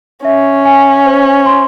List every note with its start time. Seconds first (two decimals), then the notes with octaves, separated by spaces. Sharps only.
0.25 C#4 E5
0.65 G#5
1.06 C5
1.46 C6